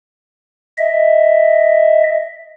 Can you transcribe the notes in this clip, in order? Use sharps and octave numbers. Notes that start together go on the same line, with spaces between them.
D#5 E5